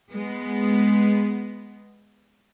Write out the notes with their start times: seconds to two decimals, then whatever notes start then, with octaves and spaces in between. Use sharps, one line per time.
0.11 G#3 B3